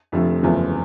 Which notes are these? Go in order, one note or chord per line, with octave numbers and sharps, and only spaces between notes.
F1 F2 D3 F3 A3
F#1 E2 C#3 F3 A3